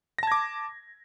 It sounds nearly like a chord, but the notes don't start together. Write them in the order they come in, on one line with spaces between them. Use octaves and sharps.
A#6 A5 G#6 D6